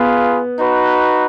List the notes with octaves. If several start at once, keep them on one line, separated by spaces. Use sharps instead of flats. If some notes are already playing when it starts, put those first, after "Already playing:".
Already playing: B3 F4 G#4 B4 F5
D#4 F#4 B4